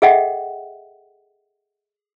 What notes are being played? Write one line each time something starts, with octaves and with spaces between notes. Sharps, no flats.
G#4 A4 D#5 E5 F#5 G5